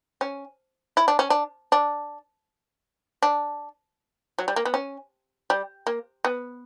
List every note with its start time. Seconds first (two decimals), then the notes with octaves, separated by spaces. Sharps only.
0.21 C#4
0.97 E4
1.08 D4
1.19 C#4
1.30 D4
1.72 D4
3.22 D4
4.38 F#3
4.48 G3
4.56 A#3
4.65 B3
4.74 C#4
5.50 G3
5.87 A#3
6.25 B3